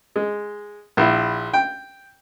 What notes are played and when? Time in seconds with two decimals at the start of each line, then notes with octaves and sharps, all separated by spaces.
0.16 G#3
0.97 A#1 E4
1.54 G5